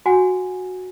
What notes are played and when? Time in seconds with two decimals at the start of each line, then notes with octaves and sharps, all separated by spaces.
0.06 F#4 F#5 G#5